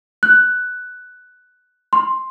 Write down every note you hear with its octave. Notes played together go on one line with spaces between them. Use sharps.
F#6
C6